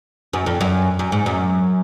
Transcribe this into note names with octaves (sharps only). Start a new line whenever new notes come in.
F#2
F2
F#2
F#2
G#2
F#2